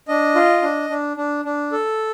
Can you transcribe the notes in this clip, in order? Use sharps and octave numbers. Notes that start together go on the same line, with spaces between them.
D4 D#5
F4
D4
D4
D4
D4
A4